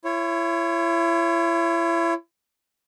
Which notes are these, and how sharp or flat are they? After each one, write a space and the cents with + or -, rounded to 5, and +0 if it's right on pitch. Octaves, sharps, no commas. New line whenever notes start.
E4 +35 C#5 -10